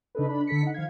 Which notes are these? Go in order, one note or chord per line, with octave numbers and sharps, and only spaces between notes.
C#3 D4 D#4 A4 B4
D4 B5
D3 A4 B6 C#7
D#4 F#5
D#3 F3 F5 G#6